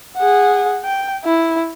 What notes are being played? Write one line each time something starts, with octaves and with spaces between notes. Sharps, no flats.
G#4 F#5
G5
E4